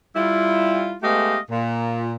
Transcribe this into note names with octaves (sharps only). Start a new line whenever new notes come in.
G3 E4 F4
G#3 A3 B3 G4 D#5 F5
A#2